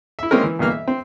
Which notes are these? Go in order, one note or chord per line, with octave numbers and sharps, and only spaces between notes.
E4 E5
G#3 A#3 C4 C#4 A#4
E3
G2 B2 E3 A#3 F6
E5
C4